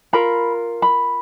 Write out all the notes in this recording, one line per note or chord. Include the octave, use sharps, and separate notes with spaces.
F4 A#4 B5
B5